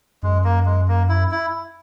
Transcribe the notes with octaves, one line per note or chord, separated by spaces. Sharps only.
F#2 G#3
A#3
G#3
A#3
E4
E4